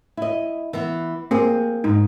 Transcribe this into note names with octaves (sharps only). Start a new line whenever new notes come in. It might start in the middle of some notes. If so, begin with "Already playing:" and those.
E4 D#5
E3 B3
A#3 C4 G#4
G#2 D#4